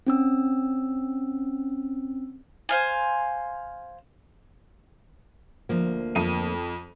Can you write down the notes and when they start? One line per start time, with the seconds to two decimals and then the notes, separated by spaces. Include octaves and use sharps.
0.07 C4 C#4 E6
2.69 C5 F5 G#5
5.69 D2 F3 A#3
6.15 F2 D#7